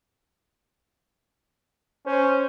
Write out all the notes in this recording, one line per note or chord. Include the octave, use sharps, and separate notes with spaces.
C#4 C5